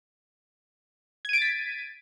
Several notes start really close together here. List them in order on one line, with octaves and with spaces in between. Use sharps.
G#6 D#7 D7 A6 B6